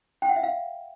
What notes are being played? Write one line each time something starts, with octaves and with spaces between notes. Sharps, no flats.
G5
F#5
E5
F5